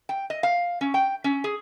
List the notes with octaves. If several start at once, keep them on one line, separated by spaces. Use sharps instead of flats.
G5
D#5
F5
C#4
G5
C#4
G#4